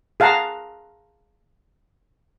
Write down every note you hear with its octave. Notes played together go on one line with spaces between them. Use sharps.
G#4 F5 F#5 A5 A#5